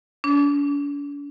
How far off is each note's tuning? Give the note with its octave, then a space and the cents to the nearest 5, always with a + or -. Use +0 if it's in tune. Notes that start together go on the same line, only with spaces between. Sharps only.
D4 -45